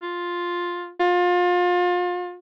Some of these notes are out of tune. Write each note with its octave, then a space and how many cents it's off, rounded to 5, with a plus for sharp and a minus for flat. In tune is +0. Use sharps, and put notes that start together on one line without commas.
F4 +5
F4 +30